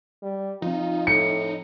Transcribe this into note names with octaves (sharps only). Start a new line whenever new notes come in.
G3
F3 C4 D#4 F4
A2 C#7